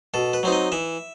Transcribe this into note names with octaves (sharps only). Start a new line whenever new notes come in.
B2 A4
B4
F#3 C4 D#4
D#5
E3 E5